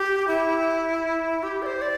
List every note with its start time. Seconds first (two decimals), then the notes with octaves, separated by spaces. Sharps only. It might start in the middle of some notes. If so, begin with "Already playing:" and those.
Already playing: G4
0.28 E4
1.43 G4
1.62 D5
1.66 C5
1.82 D5